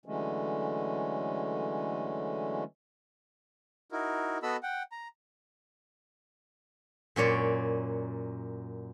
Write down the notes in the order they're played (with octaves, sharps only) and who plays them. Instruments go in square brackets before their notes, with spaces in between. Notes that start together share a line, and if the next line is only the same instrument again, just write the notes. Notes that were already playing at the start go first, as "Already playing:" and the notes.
[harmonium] D3 E3 F#3 G#3 A3 C#4
[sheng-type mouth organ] D#4 E4 F#4 A#4
B3 F#4 A4 D#5 B5 E6
F#5 G5
A#5
[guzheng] F#2 A#2 C#5 D5